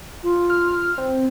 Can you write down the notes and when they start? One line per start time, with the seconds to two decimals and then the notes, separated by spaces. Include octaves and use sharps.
0.23 F4
0.50 F6
0.98 C4